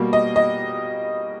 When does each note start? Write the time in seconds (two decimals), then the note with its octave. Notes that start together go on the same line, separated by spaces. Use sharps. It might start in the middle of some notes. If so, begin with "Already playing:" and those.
Already playing: B2 G3 A#3
0.13 D#5
0.36 D#5